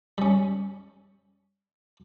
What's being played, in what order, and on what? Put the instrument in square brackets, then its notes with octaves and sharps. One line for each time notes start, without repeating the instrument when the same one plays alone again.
[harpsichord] G3 C#4